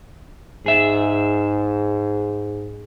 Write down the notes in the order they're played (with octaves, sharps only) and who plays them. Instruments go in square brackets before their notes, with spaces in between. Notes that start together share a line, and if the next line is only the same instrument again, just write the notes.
[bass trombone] G#2 [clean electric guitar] G#4 E5